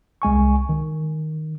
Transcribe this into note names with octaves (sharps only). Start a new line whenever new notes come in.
C2 G#3 G#5 C#6
D#3